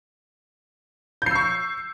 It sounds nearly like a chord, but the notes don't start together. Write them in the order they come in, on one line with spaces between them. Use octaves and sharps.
G6 C7 E6 C#6